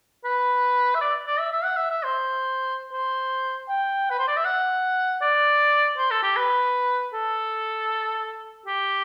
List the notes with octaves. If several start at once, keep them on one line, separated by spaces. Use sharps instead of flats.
B4
E5
D5
D5
E5
E5
F#5
E5
E5
C5
C5
G5
B4
C5
D5
E5
F#5
D5
C5
A4
G4
B4
A4
G4